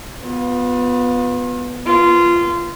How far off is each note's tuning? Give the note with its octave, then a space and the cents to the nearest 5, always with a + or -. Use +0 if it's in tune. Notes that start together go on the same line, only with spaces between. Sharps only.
B3 +0 F4 +35
B3 -40 F4 -20